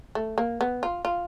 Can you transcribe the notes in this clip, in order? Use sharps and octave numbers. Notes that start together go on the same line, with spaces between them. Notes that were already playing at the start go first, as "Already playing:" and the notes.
A3
A#3
B3
F4
F4